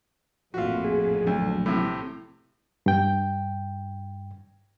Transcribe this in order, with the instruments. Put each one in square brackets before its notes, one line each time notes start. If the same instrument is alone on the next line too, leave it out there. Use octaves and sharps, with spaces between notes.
[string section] A#1 F2 A2 [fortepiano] F4 F#4
[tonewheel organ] G#4
[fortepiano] D2 [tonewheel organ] F#3 A3
[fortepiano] A2 C3
[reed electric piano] G2 G5